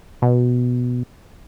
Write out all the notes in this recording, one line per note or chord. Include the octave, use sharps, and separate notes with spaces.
B2